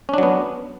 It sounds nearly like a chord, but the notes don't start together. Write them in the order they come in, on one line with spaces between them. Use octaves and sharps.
C#4 D4 F#3 B3